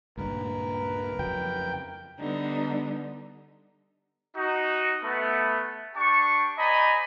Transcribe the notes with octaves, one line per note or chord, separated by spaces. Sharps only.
C#2 G2 A#2 A#4 B4
F2 C#3 F#3 G5
D3 G3 B3 D4 D#4
D#4 F#4
A3 B3
D4 G4 A5 C#6
C5 D5 D#5 G#5 A#5 B5